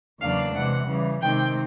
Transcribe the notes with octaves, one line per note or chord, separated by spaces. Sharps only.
E2 C#3 F#3 A#3 D4 F5
C3 E3 G#3 F#5
C#3 E3 G3
C3 D#3 G#3 C4 G5